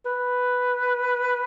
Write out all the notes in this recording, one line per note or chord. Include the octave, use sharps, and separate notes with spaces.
B4